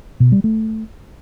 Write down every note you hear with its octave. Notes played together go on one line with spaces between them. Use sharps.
B2
G3
A3